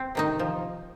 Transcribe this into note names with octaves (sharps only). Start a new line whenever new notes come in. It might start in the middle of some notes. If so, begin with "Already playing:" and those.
Already playing: C4
C3 D#3 D#4
F3